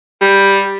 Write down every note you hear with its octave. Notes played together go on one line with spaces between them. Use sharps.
G3